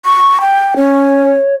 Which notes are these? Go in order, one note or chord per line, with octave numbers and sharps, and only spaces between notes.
C#6
G5
C#4 C#5